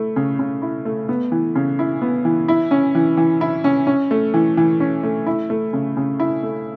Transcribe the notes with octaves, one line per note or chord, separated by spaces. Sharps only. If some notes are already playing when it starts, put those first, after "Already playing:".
Already playing: A3 E4
C#3
C#3
E4
A3
B3
E3
C#3
E4
B3
E3
E4
C#4
E3
E3
E4
C#4
C#4
A3
E3
E3
C#4
A3
E4
A3
C#3
C#3
E4
A3